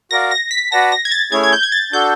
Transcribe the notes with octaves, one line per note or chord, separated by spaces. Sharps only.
F#4 A#4 D5 F5 A#6
A#6
B6
F#4 B4 D5 F#5 A5 A#6
A#6
G#6
A6
A3 C#4 E4 G#4 C#5 G#6
G#6
G6
G#6
A6
D4 F#4 A4 G6